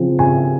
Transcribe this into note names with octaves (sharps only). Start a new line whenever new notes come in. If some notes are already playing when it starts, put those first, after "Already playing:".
Already playing: C#3 F3 C4
C#3 G#5